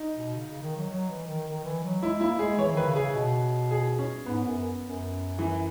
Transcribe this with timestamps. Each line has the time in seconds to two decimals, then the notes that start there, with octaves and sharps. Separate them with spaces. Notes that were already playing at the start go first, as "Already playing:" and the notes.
Already playing: D#4
0.16 B2
0.34 C#3
0.48 C#3
0.62 D#3
0.77 F#3
0.90 F#3
1.09 E3
1.27 D#3
1.47 D#3
1.64 E3
1.84 F#3
2.03 G#3 E4
2.20 A#3 E4
2.39 G#3 G#4
2.58 E3 C#5
2.73 D#3 B4
2.86 C#3
2.96 G#4
3.01 C#3
3.15 B2
3.71 G#4
3.99 C#4
4.26 G#2 B3
4.45 F#2
4.82 F#2
5.39 E3